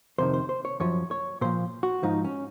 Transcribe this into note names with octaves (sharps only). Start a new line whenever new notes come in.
F2 C3 D#3 C5
C5
C5
C#5
F#2 F3 C#5
C#5
A#2 F3 C5
F#4
G#2 F3 D#4
C#4